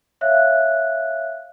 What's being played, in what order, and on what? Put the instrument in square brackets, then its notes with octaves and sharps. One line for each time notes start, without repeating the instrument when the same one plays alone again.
[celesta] C#5 E5 F5 F#6